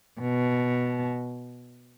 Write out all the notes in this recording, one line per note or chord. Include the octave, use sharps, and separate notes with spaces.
B2